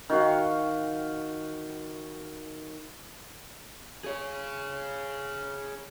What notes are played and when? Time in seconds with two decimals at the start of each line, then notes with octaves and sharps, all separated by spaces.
0.09 D#3 F#4 F5
4.04 G#4 C#5